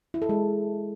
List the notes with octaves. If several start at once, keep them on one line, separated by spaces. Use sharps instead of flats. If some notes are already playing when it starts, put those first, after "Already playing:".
E4
A4
G#3